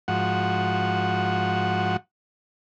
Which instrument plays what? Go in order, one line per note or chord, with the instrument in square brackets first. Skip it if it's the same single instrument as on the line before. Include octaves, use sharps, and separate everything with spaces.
[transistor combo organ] G#2 F3 F#4 F#5